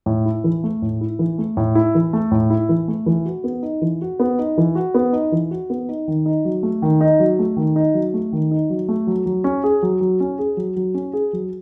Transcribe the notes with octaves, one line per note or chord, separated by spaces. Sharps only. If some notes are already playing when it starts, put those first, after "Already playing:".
A2
E4
E3
A3
A2
E4
E3
A3
A2
E4
E3
A3
A2
E4
E3
A3
E3
F#4
B3
D#4
E3
F#4
B3
D#4
E3
F#4
B3
D#4
E3
F#4
B3
D#4
D#3
D#4
F#3
A3
D#3
D#4
F#3
A3
D#3
D#4
F#3
A3
D#3
D#4
F#3
A3
F#3
F#3
C#4
G#4
F#3
F#3
C#4
G#4
F#3
F#3
C#4
G#4
F#3